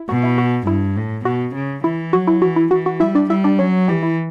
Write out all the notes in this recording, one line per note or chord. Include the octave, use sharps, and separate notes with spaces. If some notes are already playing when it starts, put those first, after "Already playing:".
Already playing: E4
B2 F#4
E4
F#4
G2 E4
A2
B2 F#4
C#3
E3 E4
F#3 F#4
E4
E3 F#4
E4
E3 F#4
F#4
G3 E4 E5
D4 D5
G3 E4 E5
D4 D5
F#3 C#4 C#5
E3 G3 G4
E4